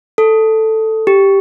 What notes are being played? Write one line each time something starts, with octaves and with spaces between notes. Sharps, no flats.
A4
G4